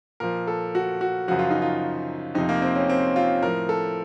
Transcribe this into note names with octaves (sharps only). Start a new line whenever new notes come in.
A#2 F3 A#4
A4
F#4
F#4
F#2 C#3 F3 F#4
F4
D#4
F4
F2 C3 F3 D#4
A#3
C4
C#4
C4
F4
A2 F3 A#4
A4